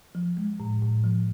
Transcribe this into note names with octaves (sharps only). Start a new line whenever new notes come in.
F3
G#3
A2
A2
F3